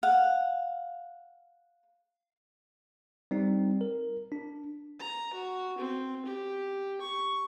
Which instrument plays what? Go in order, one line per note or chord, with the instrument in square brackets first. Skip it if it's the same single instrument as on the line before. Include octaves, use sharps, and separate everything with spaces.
[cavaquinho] F5 F#5
[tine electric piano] G3 C4 D#4
A#4
D4
[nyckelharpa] A#5
F#4
C4
G4
C#6